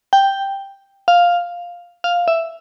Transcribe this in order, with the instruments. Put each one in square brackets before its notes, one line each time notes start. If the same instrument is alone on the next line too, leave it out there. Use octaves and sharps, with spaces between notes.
[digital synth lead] G5
F5
F5
E5